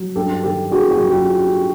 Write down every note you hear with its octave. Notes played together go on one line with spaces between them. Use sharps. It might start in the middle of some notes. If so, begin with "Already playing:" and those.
Already playing: F#3
G2 G4 A4
D#3 G4 A4
G2 F#4 G#4
F#4 G#4
F#3
F4 G4